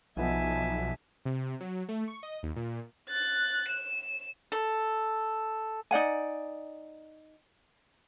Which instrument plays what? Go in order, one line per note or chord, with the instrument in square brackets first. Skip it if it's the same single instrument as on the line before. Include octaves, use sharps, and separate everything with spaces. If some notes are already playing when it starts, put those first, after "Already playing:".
[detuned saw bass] B1 [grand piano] F3 B3 D#4 [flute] E5 [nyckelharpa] G#5 A5
[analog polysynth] C3
F#3
A3
C#6
D#5
D#2
A#2
[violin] F#6 A6
E7
[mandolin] A4
[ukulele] D#4 D5 F#5 G#5